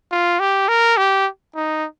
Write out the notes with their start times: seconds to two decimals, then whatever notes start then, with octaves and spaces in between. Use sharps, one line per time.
0.11 F4
0.39 G4
0.68 A#4
0.97 G4
1.55 D#4